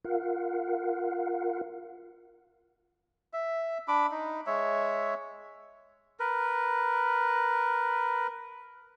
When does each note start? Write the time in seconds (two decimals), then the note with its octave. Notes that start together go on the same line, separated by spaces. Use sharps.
0.04 F4 A#4 F5 F#5
3.33 E5
3.88 D4 B5 D6
4.11 D#4
4.47 G#3 C#5 E5
6.20 A#4 B4